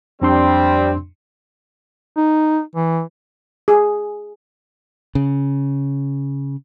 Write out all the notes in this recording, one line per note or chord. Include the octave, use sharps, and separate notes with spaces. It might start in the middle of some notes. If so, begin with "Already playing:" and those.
F2 G3 C4 D4 C6
D#4
E3
G#4
C#3